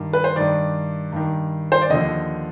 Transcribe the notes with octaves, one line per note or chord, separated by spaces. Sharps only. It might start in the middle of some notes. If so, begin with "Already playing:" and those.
Already playing: G2 D#3
B4
C5
G2 D#3 D5
G2 D#3
C5
D5
D#2 D3 F3 D#5